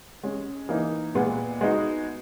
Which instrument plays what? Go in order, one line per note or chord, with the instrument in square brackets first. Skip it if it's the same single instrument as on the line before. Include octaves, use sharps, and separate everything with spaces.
[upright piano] G#3 C#4 G#4
E3 A#3 D#4
A#2 G#3 B3
G#3 B3 D#4 F#4